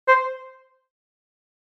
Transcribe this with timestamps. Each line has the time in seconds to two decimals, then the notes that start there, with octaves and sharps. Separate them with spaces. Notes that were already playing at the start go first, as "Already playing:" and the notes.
0.08 C5